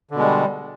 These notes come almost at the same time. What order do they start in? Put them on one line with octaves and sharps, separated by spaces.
D3 B2 G#3 G3